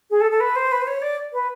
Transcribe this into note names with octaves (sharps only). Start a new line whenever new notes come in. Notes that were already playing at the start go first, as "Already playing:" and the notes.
G#4
A4
A4
B4
C5
B4
C5
C#5
D5
B4